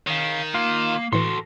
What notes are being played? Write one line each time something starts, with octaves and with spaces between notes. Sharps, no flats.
D#3 C#5 F5
A#3 F4
A2 E3 F#4 A4 C6